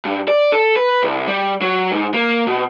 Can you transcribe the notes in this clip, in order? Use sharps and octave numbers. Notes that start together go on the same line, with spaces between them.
G2
D5
A4
B4
C2
G3
F#3
G#2
A#3
B2